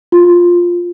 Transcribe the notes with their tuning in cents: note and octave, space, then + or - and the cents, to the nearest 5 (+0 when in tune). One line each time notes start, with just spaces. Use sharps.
F4 +5